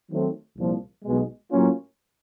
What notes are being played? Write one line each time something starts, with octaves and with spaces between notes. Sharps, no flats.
D#3 F#3 A3 C4
C2 A#2 F3
B1 B2 G#3
A2 F#3 A#3 C#4 F4